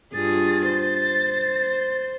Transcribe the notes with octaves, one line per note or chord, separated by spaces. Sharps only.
G2 F4 G#4 A6
C5